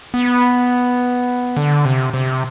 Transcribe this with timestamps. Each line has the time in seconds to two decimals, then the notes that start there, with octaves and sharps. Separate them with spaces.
0.14 B3
1.57 D3
1.85 C3
2.14 C3